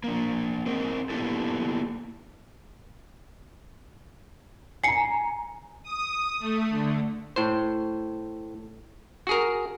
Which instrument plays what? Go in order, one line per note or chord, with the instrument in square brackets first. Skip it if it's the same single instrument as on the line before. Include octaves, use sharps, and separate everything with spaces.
[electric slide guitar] A#3 D4
C4 G#4 A#4
A#3 B3 D4 E4 G4 A4
[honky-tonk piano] G#5 A#5 [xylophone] C7 C#7
[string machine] D#6
A3
D3
[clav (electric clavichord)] A2 C5
F#4 G#4 A#4